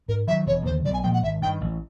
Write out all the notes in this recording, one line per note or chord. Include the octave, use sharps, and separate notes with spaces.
G#2 A#4
D#3 F#3 E5
E1 C#5
D#2 D3 C5
B1 D5
G#5
A#2 F3 G#3 G5
F#5
G#1 E5
G2 D#3 G5
A1